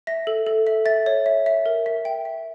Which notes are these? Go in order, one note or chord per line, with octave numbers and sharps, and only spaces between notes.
E5 A#6
A4
A4
E5
E5 A6
C#5
E5
E5
A#4
E5
G5
E5